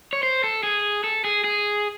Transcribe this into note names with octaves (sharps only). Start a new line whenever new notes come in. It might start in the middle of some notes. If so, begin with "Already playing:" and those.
C#5
C5
A4
G#4
A4
G#4
G#4